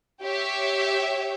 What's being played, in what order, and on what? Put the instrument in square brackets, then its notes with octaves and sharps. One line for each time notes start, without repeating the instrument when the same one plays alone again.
[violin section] G4 C#5 E5